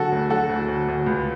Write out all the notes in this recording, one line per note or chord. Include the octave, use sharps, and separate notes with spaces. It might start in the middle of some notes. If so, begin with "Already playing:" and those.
Already playing: D3 F#3 F#4 A4
D2
F#3 F#4 A4
D2
D2
D2
C#2